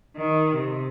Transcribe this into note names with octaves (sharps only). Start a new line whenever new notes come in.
D#3
C3